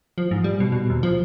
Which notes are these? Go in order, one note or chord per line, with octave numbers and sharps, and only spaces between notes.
F3
G#2
G3
B2
B2
D#2
F3